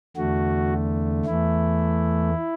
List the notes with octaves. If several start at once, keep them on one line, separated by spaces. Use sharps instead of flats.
E2 D3 A3 F#4
E2 E3 A3 E4